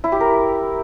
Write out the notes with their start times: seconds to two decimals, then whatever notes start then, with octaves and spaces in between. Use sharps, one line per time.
0.04 E4
0.12 G4
0.20 A#4